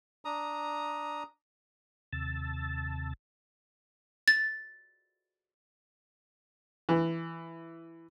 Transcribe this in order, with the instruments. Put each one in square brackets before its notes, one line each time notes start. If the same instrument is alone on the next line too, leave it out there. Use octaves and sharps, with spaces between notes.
[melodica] D4 A#5 D#6
[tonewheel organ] D#2 C3 A5 E6 A6
[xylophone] A6
[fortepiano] E3